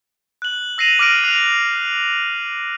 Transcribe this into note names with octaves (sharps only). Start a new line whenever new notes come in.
F#6 F#7
E6 A#6 C7 D#7 F7 F#7
D6 F6 A#6 D7
F#6 C7 F7